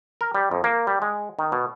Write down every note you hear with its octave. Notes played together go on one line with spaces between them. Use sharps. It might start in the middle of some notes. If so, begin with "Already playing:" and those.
A#4
G3
F2
A#3
G3
G#3
D#3
B2